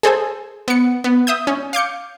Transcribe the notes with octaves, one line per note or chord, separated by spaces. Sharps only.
G#4 A4 C5 G#5
B3 C#7
B3
E5 D#6 G6
C#4
F5 D6 G6 C#7